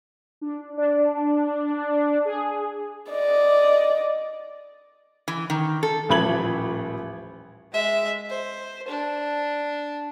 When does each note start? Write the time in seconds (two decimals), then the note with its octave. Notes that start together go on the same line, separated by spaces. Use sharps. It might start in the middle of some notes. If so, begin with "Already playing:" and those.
0.41 D4
0.77 D4
2.25 G#4
3.12 D5 D#5
5.28 E3
5.50 D#3
5.83 A4
6.09 D#1 A1 F3 B5 G#6 F#7
7.72 G#3 E5
8.29 C5
8.88 D4